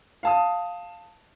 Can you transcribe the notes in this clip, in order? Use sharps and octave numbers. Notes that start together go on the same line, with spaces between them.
F5 A5 D#6